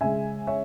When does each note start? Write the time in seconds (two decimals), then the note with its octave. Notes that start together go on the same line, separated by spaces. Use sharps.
0.01 C#3 G#3 E5 G#5
0.47 C#5 E5